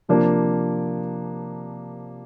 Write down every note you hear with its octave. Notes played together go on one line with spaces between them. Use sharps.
C3 F3 A#3 D4